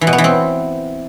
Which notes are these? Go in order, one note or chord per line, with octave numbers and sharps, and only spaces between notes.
E3
B2
B3
E3
C4